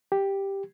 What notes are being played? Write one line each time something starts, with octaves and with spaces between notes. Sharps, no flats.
G4